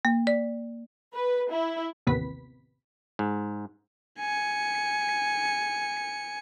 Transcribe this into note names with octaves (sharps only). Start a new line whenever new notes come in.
A#3
D5
B4
E4
A1 D#2 C3 B3 B5 B6
G#2
G#5 C#7